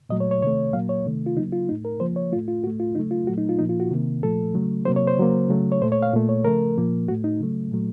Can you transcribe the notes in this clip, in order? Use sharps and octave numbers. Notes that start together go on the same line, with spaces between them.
A#2 F#3 A3 D#5
C#5
C#5
C3 D#3 A3 C#5
A#2 F#3 A#3 F5
C#5
C3 D#3 A3
F4
C#3 F#3 A#3 D#4
F4
A2 A3 D#4
A#4
C#3 F3 A#3 C5
C#5
A2 A3 F4
F4
A2 A3 F#4
F4
C#3 F#3 A3 D#4
F4
A#2 F#3 A3 F#4
D#4
F4
A#2 F3 A#3 D#4
F4
F#4
C3 D#3 A#3
A#2 F3 A3 A4
C#3 F#3 A3
C3 F#3 A#3 C5
C#5
C5
C#3 F#3 A#3
C#3 F#3 A3
C#5
A#2 A3 C5
C#5
F5
A#2 A3
C#5
C#3 F3 A3 A#4
A#2 F3 A#3
A2 A3 F#4
D#4
C#3 F#3 A3
A#2 F#3 A3